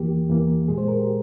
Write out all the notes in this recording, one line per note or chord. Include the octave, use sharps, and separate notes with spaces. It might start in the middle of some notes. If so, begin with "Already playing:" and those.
Already playing: E2 E3 A#3 G4
E2 E3 A#3
A#2 G#3 G#4
C5
A#4
G4